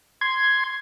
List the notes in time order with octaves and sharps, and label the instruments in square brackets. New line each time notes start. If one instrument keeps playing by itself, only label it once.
[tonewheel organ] C6 G#6